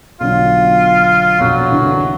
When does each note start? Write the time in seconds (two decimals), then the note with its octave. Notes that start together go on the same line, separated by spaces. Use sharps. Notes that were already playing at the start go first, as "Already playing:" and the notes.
0.20 B1 D3 F#3 F4
1.40 A#1 F2 B2 F#3
1.71 C2 D3 E3